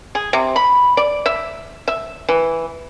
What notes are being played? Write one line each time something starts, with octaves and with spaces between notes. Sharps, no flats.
G#4
C3
B5
D5
E5
E5
E3